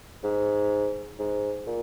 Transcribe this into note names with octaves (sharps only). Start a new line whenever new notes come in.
G#2
G#2
A#2